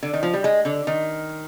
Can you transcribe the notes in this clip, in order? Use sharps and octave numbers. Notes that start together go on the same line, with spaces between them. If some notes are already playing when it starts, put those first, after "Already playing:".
D3
D#3
F3
G3
G#3
D3
D#3